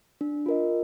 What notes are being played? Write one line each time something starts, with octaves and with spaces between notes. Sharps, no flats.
D4
F4 A#4 D#5